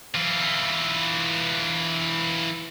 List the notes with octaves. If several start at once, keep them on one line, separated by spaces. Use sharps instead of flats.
E3 F4